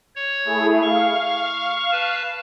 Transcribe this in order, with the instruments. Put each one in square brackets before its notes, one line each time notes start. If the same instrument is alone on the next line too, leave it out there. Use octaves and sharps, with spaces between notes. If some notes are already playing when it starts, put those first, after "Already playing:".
[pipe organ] C#5
[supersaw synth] A3 E4 G#4
[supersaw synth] F5 [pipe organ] C#6
[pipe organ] B4 A5